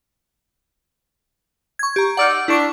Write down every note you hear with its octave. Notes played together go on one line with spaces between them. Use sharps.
C#6 G#6
G4 A#5
D#4 D5 F#5 E6 F6
D4 E4 C#6 D7